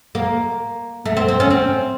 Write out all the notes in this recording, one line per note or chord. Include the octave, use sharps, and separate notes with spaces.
A#3
A3
C4
C4
C#4
C4